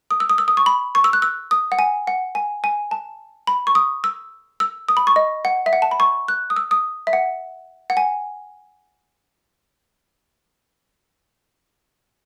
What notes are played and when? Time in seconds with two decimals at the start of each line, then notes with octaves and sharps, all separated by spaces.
0.11 D#6
0.20 E6
0.30 D#6
0.38 E6
0.48 D#6
0.57 C#6
0.66 B5
0.95 C#6
1.04 E6
1.13 F#6
1.22 E6
1.51 D#6
1.72 F#5
1.79 G#5
2.07 F#5
2.35 G#5
2.64 G#5
2.91 A5
3.47 B5
3.67 C#6
3.75 D#6
4.04 E6
4.60 E6
4.89 D#6
4.97 B5
5.07 C#6
5.16 D#5
5.45 F#5
5.66 E5
5.73 F#5
5.82 A5
5.91 B5
6.00 C#6
6.28 F#6
6.50 D#6
6.56 E6
6.71 D#6
7.07 E5
7.13 F#5
7.90 F#5
7.97 G#5